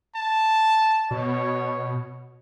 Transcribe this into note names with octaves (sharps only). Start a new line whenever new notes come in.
A5
B2 C#5